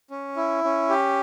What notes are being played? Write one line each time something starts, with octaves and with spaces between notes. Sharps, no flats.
C#4
E4
C#4
G4